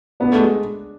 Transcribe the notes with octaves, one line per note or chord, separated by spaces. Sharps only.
B3 D4
A3
G#3